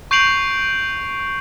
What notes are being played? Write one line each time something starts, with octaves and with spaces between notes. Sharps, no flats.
C#6 G6 C7 D7 F7 F#7